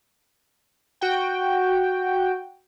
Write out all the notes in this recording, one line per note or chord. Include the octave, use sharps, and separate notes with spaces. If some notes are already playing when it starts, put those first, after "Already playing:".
F#4 G5